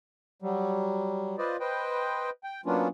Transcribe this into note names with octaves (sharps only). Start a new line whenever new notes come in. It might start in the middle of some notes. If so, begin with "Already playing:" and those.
F#3 G3
F4 B4 C5 D5 D#5
B4 C5 D#5 G5
G5
F#3 A#3 B3 C#4 D4 F4